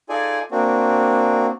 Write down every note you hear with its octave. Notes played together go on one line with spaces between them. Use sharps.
D#4 F4 G#4 A4 D5 G#5
A#3 C4 D4 F#4